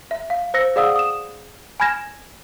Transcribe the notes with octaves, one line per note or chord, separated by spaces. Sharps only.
E5
F5
C5 F5 E6 A#6 C#7
G#4 D5 F5 F#5 D#6 E6
D#6 E7
G#5 B5 F6 G#6 A#6 E7